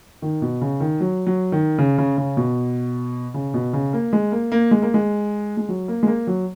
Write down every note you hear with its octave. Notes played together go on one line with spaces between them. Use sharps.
D#3
B2
C#3
D#3
F#3
F#3
D#3
C#3
C#3
C#3
B2
C#3
B2
C#3
A#3
G#3
A#3
A#3
G#3
A#3
G#3
G#3
F#3
A#3
G#3
A#3
F#3